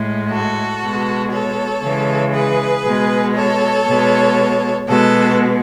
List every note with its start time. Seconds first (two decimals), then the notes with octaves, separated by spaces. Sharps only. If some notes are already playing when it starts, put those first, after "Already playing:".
Already playing: A2 G#3
0.29 F#4 A4
0.81 B2 G#3
1.32 A4 C#5
1.82 C#3 E3 G#3
2.33 G#4 B4
2.85 B2 G#3
3.36 A4 C#5
3.86 B2 G#3
4.88 B2 G#3 F#4 A4